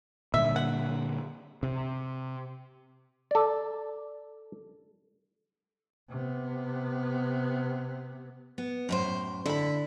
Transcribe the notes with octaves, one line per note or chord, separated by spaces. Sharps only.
A#2 D3 G3 E5
F#5
C3
A4 D5
C3 B3
B3
F#2 A2 C5
D3 E4 B5